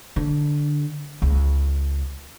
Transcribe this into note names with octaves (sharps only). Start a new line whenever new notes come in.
D3
C#2